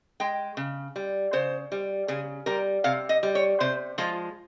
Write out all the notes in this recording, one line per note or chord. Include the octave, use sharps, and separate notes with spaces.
G#3 G5
C#3
G3
C#3 C5
G3
C#3 G#4
G3 A#4
C3 F5
D#5
G3
C#5
C3 C5
F3 G#3 F4